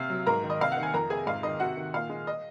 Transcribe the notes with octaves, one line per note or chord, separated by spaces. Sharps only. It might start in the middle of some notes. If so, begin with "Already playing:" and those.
Already playing: C3 F5 F6
F#3
G#2 A#4 A#5
D#3
D#5
C3 F5
D#3 F#5
G#5
F2 A#4 A#5
C3 G#4 G#5
G#2 F5
D#3 D#5
C3 F#4 F#5
D#3
A#2 F5
G#3
D#5